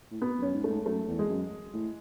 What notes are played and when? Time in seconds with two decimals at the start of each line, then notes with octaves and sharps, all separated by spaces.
0.11 A2
0.20 B2 B3
0.38 F#2 C#4
0.54 G#2
0.64 A3
0.69 G#2
0.86 F#2 A3
1.08 E2
1.19 G#3
1.29 F#2
1.74 A2